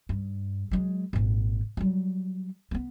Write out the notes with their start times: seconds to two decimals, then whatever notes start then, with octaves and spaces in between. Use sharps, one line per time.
0.09 G2
0.71 F#3 G#3
1.13 G#1 A#2
1.77 F#3 G3
2.71 A#3 B3